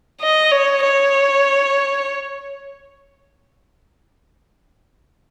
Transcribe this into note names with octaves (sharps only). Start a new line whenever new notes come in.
D#5
C#5
C#5